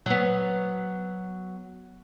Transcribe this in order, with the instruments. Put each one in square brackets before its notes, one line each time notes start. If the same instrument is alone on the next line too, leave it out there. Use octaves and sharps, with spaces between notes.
[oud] F#3 B3